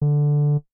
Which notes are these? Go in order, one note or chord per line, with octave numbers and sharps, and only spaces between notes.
D3